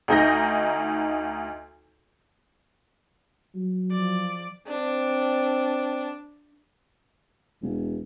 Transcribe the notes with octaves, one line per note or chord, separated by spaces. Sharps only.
D2 D#4 G6 A#6
F#3
F3 D5
C4 D4
E1